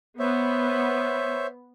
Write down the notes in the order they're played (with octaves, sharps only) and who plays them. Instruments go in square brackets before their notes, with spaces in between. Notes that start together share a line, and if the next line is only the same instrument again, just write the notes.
[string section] B3 [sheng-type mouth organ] C5 C#5 E5